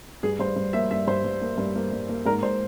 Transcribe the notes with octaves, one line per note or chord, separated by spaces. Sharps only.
G2 G#4
G2 C5
G2
A#3 E5
G2 E5
G2 C5
G2
A#3
G2
A#3
G2
A#3
G#2 A#4
G#2 C5